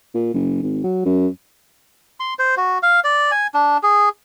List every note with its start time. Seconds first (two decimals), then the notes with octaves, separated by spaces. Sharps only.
0.15 A#2
0.34 F#1
0.63 G#1
0.84 F#3
1.06 F#2
2.20 C6
2.39 C5
2.57 F#4
2.83 F5
3.04 D5
3.31 G#5
3.54 D4
3.83 G#4